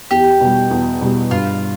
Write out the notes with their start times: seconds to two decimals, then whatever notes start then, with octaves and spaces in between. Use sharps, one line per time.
0.11 E2 G4
0.40 B2 G3
0.71 E2
1.01 B2 G3
1.31 G2 F4